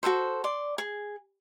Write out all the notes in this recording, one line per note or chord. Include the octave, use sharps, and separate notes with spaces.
F#4 G#4 A4 C5
D5 C6
G#4